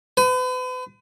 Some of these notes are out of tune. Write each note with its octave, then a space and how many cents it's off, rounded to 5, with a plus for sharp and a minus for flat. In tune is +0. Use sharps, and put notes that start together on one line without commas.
B4 +40